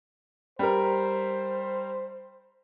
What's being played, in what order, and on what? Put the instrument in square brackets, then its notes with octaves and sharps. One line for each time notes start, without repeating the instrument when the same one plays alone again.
[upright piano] G3 A#4 [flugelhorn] C5